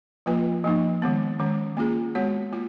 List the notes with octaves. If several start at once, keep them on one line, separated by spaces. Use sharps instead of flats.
F3 A#3 F4 B4
F3 A#3 D#4
D#3 G#3 B3
D#3 G#3 C#4
A#3 C#4 F4 G#4
G#3 B3 F#4 C#5
A#3 F4